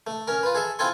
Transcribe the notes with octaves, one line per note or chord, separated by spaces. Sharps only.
A3
C#4 A#4
F4 B4
G#4 A4 E5
C4 E4 F4 A4 G#5 C6